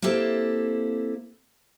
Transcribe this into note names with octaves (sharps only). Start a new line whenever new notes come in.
A#3 C4 E4 G4 A4